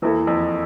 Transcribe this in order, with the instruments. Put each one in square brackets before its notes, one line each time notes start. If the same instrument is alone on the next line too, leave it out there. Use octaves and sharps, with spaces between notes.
[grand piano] E2 [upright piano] E3 A#3 E4 A4
[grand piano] F2